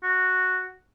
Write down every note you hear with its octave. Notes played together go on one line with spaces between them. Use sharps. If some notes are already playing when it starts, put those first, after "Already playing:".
F#4